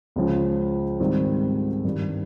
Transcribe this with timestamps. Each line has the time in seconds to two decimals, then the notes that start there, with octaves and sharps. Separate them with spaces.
0.16 C#2 C#3 F3
1.00 G#2 D#3 G3 C4 D#4
1.85 G2 D#3 G3